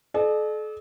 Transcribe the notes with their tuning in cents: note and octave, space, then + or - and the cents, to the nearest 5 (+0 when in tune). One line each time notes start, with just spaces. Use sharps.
A4 -40 D5 +45